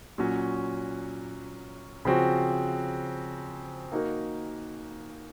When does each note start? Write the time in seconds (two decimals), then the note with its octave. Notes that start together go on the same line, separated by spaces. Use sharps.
0.18 A#2 F#3 C#4 F#4
2.05 C#3 F3 C4 F#4
3.92 A#3 D#4 F#4 A#4